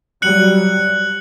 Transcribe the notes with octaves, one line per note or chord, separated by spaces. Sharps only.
F#3 G3 F#6 C#7 F#7